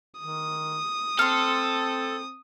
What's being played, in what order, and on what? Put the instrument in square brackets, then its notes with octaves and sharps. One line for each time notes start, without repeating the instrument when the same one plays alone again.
[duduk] D#3 [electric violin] D#6
[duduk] C4 [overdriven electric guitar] A4 [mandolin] C6 F6